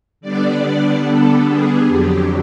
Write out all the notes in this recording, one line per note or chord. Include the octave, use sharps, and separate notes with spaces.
D3 G3 B3 D4 D5
D3 G3 B3 D4 A4
G#4
F2 D3 F#3 G4